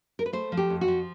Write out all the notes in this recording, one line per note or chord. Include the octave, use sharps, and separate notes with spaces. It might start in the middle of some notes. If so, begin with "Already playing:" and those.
A#4
B4
A3 C5
F3
G4
F2
F#4
F3